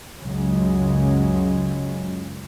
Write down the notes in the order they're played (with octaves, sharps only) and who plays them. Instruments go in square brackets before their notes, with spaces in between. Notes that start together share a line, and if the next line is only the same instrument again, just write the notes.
[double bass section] C#2 F#2 C#3 F#3 G#3